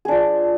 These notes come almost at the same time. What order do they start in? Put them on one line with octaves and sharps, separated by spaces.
G#4 D4 F3